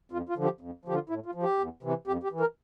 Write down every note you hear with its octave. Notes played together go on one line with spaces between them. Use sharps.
F2 F4
F4
D3 F3
G4
F2
D3 F3 G4
F4
A2 E4
F4
F3
G4
E2
C3 E3
F2 G4
G4
E3
A#4